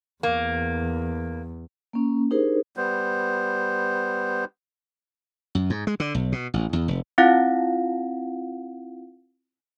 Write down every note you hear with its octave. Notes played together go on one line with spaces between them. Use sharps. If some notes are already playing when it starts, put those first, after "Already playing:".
E2 A#3
A#3 C#4
D4 D#4 G4 G#4 A#4 C5
G3 B3 C5
F#2
G#2
G#3
D3
B1
B2
A1
E2
F1
C4 E4 F4 F5 F#5